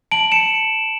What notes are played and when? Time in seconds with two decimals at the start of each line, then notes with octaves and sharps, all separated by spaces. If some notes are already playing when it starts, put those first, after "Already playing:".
0.12 A5 D7 F#7
0.32 C#7 E7